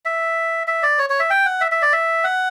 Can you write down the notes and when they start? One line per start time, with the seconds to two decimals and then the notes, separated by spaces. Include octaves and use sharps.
0.05 E5
0.67 E5
0.83 D5
0.99 C#5
1.10 C#5
1.20 E5
1.30 G5
1.46 F#5
1.61 E5
1.72 E5
1.82 D5
1.93 E5
2.24 F#5